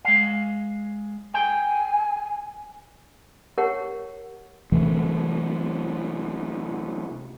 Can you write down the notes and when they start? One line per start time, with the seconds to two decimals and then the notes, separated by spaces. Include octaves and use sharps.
0.05 G#3 F5
1.34 G5 G#5
3.58 G4 A#4 C#5 F#5
4.72 C3 E3 A3